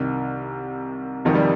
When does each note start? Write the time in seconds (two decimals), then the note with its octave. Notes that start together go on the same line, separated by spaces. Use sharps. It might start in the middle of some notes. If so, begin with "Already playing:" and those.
Already playing: C2 C3 D#3
1.25 F1 F2 D#3 F3
1.35 G3